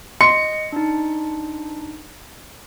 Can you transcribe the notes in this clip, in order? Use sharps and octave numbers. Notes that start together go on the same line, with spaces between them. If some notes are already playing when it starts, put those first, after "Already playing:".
D#5 C6 C#7
D4 D#4